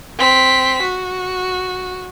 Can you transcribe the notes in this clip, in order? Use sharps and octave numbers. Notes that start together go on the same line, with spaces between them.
C4 B6
F#4